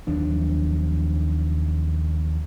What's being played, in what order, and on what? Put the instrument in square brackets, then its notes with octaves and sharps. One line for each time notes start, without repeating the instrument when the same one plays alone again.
[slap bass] D#2 F3 F#3 D4